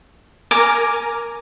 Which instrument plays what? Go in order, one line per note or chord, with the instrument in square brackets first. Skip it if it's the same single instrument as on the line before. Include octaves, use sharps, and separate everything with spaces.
[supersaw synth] A#4 G#5 A#5 [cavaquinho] D6